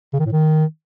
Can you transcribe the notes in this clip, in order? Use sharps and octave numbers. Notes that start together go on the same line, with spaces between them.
C#3
D#3
A2
D#3